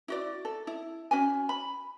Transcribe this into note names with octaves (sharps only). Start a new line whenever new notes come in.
E4 F#4 D5
A4
E4
C#4 F#4 G#5
B5